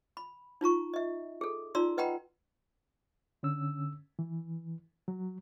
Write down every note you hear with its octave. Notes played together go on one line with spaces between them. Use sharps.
B5
D#4 F4 A#5 C#6
D#5 E5
G#4 A4
D#4 F4 D5 A#5 C6 E6
B4 D#5 F#5 G5 A#5 B5
D3 C#4 E6
E3
F#3